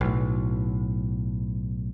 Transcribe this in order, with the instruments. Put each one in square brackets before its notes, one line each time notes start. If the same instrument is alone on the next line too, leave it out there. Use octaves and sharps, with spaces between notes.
[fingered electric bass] B1 A2